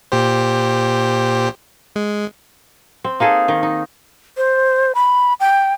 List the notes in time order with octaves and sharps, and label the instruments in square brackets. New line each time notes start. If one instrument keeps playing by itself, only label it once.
[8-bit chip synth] A#2 G4 C5
G#3
[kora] C4
A#3 D#4 G#4 A4
D#3
D#4
[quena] C5
B5
G5